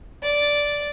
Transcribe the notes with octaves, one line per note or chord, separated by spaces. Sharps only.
D5